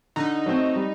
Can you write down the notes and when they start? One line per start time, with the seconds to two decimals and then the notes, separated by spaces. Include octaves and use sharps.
0.16 D3 D#4
0.46 F#3 A3 C4
0.76 G3